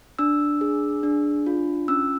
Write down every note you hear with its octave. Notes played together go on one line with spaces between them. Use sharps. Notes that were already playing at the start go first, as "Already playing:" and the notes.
D4 E6
G#4
D4
F4
C#4 E6